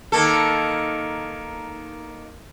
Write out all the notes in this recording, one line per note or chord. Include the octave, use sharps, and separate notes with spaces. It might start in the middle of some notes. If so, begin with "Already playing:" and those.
D#3 A#3 A4